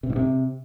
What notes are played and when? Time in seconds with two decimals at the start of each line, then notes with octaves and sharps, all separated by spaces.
0.03 C3
0.10 G#2
0.16 C3